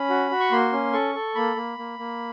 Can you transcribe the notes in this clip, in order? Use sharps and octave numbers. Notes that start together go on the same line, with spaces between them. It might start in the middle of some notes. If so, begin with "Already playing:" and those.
Already playing: C#4 B5
F#4
F#4
C#6
A#3 C6
C#4
A4 C#6
A4
A#3 B5
A#3
A#3
A#3